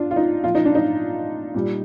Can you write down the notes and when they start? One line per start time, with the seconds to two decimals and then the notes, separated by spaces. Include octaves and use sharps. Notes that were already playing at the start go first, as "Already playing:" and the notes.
Already playing: D4 F4
0.11 F4
0.16 D#4
0.43 A#2 F3 F4
0.55 D#4
0.65 D4
0.75 D#4
1.54 A#2 G3